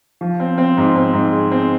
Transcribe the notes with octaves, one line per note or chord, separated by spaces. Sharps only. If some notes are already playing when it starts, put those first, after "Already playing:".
F3
C4
C4
G#2
C4
G#2
G#3
C4